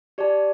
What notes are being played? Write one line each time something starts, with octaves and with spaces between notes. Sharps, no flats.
G4 D5 A5